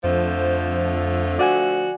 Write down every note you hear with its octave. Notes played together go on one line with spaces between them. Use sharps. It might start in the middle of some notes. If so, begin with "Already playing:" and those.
F2 D3 F3 A3 C5
F#4 D5 F#5 G#5